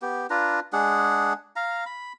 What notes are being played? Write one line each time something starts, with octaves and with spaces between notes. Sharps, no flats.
B3 G4
D4 F4 B4 A#5
G#3 D4 G#4 F#5
F5 A#5
B5